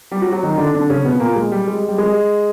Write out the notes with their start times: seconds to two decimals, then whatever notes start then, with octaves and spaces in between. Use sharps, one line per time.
0.11 G3 G4
0.22 F#3 F#4
0.32 F#3 F#4
0.43 D#3 D#4
0.58 D3 D4
0.74 D3 D4
0.90 C#3 C#4
1.05 B2 B3
1.20 A#2 A#3
1.35 G#3
1.52 G3
1.67 G#3
1.88 G3
1.98 G#3